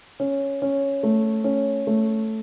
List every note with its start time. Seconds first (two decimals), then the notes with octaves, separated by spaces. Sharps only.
0.20 C#4
0.62 C#4
1.03 A3
1.44 C#4
1.87 A3